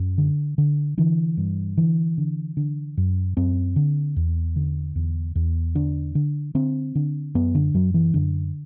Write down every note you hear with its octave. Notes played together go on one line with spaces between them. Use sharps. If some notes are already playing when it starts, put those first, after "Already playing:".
Already playing: F#2
D3
D3
D3 E3
G2
D3 E3
D3
D3
F#2
F#2 C4
D3
E2
D3
E2
E2
D3 D4
D3
D3 C4
D3
F#2 B3
D3
F#2 F#3
E3
F#2 D3